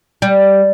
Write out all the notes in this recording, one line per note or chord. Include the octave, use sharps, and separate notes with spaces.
G3